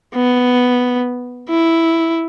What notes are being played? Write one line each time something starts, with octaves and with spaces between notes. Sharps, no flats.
B3
E4